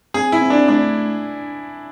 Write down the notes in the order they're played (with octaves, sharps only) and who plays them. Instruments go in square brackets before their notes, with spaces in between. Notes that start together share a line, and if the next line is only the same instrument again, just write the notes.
[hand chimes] C4 [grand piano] G#4
[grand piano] E4
[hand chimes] C4
[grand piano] D4
[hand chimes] A3 [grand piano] D4